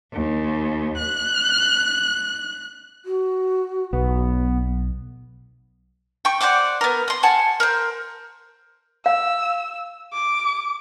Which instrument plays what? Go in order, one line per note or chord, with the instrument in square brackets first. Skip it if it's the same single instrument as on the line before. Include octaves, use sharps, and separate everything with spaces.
[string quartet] D#2
F#6
[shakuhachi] F#4
[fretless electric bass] B1 [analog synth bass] B3
[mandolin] G5 C#6
C5 D5 F#5 D6
B3 A#4
C6 D#6
F#5 G#5 A5
A#4 C5
[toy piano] F5 [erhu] E6
[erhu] D6